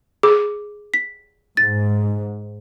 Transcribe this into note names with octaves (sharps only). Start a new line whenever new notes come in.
G#4 D6
B6
G#2 A6